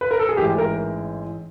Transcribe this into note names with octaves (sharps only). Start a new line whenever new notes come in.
B4
A#4
A4
G#4
A1 G#2 E3 G4
A#4